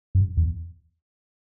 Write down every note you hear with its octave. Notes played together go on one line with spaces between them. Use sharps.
F#2
E2